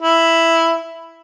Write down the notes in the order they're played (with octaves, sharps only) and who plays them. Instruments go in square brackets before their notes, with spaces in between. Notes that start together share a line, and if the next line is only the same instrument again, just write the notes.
[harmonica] E4